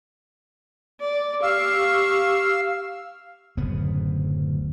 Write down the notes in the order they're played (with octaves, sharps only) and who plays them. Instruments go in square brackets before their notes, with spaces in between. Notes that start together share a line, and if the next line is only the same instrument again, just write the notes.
[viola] D5
[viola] G4 C#6 [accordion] F5 E6
[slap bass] D1 F#2 C#3 B3